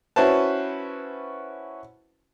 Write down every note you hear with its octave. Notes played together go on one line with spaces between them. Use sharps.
C#4 E4 F#4 B4 C5 A5